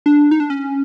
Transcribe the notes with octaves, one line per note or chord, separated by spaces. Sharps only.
D4
D#4
D4
C#4